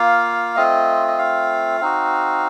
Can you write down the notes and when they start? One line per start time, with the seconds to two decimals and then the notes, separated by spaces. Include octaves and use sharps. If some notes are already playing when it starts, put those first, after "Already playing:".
Already playing: A#3 F4 F5
0.56 A3 C4 F4 D#5
1.08 D#5
1.18 F5
1.80 C4 D#4 F#4